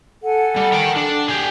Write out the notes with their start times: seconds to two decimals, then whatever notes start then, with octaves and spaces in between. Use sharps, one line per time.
0.22 A4 F#5 G#5
0.56 G3
0.73 A#4 G5
0.96 D4
1.28 G4 G#4